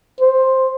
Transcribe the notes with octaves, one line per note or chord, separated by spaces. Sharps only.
C5